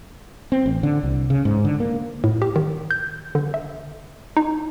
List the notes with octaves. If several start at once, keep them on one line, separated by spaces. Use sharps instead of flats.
C4
A1
D3
C2
C#3
G#2
D3
A#3
A2
G4
D#3
G6
D3
E5
D#4